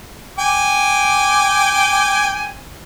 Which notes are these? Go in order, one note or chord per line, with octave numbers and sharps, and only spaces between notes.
G5 G#5 D6